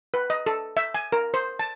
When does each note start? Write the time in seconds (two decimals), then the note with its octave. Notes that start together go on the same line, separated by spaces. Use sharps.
0.14 B4
0.30 D#5
0.46 A4
0.77 E5
0.94 G#5
1.12 A#4
1.34 C5
1.59 A5